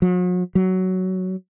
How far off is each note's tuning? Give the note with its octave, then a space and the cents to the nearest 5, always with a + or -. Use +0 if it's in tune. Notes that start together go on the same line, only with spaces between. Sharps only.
F#3 -45
F#3 +10